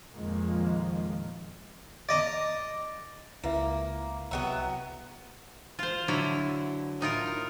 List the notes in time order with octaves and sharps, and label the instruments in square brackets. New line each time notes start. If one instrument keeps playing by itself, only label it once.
[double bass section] F2 A#2 D#3 F3 G#3 A#3
[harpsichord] D5 D#5 A#5
[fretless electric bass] C#2 [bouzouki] A#3 [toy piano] E4 B4 E5
[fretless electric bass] C2 [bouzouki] F#3 B3 E5 [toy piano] G5 A#5
[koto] F4 C5
D3 F#3 E4
A2 D#4 F4 A#4